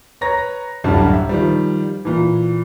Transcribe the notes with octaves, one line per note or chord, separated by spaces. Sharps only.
B4 C#5 A#5 A#6
D1 C2 F#2 D3 G3 A5
E5
D#3 F3 G3
A#2 E3